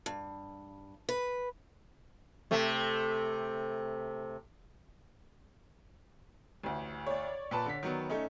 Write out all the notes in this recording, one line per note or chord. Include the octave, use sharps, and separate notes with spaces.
G2
B4
C3 A3
A1 D2
C#5 D5
A#2 B4 A5
D3 B6
D#3 F#3 B3
A3 C#4 D#4